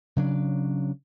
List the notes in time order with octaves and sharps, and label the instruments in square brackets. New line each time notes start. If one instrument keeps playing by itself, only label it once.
[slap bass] C#3 F#3 D4